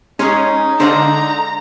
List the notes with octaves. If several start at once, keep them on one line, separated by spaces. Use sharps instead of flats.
G#3 C#4 D#4 G#4
D3 C5 D5 F5 A#5